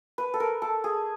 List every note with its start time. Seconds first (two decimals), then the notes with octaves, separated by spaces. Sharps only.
0.18 B4
0.34 A4
0.40 A#4
0.62 A4
0.84 G#4